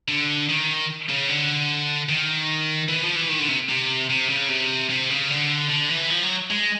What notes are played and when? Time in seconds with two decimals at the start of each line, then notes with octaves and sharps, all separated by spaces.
0.08 D3
0.49 D#3
1.09 C#3
1.29 D3
2.09 D#3
2.89 E3
3.03 F3
3.16 E3
3.29 D#3
3.40 D3
3.49 C3
3.69 C3
4.10 C3
4.29 C#3
4.49 C3
4.90 C3
5.09 C#3
5.30 D3
5.70 D3
5.90 E3
6.10 F3
6.23 F#3
6.50 G#3